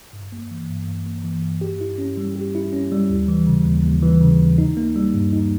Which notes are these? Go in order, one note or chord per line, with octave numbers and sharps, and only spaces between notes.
G2
A#3
E3
G2
G2
A#3
E3
G2
G4
E4
C#4
G3
G4
E4
C#4
G3
D#2
E3
C#3
D#2
D#2
E3
C#3
D#2
D#4
A#3
G3
G2
D#4